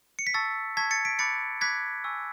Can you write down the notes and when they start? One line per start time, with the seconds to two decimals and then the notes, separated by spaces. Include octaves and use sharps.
0.19 C#7
0.27 B6
0.34 A5 C#6 E6 A6
0.77 A5 C#6 E6 G#6 B6
0.91 A6 C#7
1.05 B6 D7
1.19 B5 D6 F#6 A6 C#7
1.61 B5 D6 F#6 G#6 B6
2.04 G#5 C#6 E6